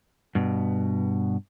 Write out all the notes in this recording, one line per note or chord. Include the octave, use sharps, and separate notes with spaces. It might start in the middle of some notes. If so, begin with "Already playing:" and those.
G2 B2